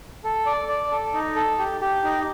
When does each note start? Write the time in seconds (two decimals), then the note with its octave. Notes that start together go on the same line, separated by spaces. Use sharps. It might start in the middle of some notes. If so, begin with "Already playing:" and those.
0.24 A4
0.46 D5
0.68 D5
0.91 A4
1.14 D#4
1.36 A4
1.59 G4
1.81 G4
2.04 D#4